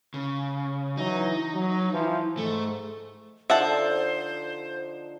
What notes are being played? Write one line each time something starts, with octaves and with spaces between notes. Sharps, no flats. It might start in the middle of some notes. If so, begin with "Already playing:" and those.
C#3
E3 F#3 D#4
F#3
E3 F3
G#2 A3
D3 F3 D#4 C5 E5 F#5 A5